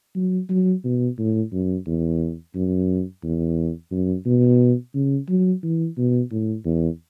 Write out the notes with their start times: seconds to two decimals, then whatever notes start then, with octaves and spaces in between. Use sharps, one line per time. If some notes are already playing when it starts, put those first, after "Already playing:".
0.16 F#3
0.50 F#3
0.84 B2
1.19 A2
1.52 F#2
1.87 E2
2.55 F#2
3.23 E2
3.91 F#2
4.26 B2
4.94 C#3
5.29 F#3
5.63 E3
5.97 B2
6.31 A2
6.65 E2